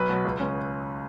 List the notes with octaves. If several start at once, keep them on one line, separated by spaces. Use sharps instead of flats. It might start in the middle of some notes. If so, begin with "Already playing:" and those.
Already playing: B1 B4
B2 F#3
C#2
C#3 G#3 C#4